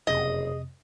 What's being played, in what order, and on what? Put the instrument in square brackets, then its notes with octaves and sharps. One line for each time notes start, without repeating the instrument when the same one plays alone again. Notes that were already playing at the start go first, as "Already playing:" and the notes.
[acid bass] F#1 [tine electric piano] F2 C3 [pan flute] G#4 [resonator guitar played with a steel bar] D#5